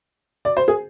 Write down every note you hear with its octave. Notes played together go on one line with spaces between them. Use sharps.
D5
C5
G#4